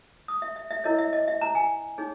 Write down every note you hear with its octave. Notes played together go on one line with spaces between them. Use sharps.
D#6
E5
E5
E5
E4 A#4 C#5 D#5
E5
D#5
E5
A#5
G#5
D#4 G#4 C#5